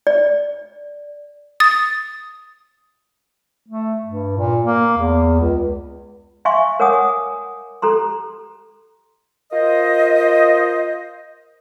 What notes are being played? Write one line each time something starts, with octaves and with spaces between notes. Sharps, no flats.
D5
D#6 A6
A3
G2
A#2
A#3
E2
C#2
E5 F5 G#5 C6 C#6
A#4 C#5 F#5 G#5 D6 D#6
G4 A4 A#5 C6
F4 A#4 C5 D#5